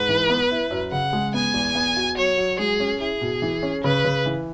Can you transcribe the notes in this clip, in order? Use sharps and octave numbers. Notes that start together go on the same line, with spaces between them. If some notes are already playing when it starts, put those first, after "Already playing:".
Already playing: G#2 B4
E3
B3
E4
F#2
C#3 F#5
G#3
B3 G#5
E2
B3
F#4
F#3 C#5
F#3
G#3 G#4
C#4
E4 G#4
B2
E3
C#4
C#3 B4
C#3
E3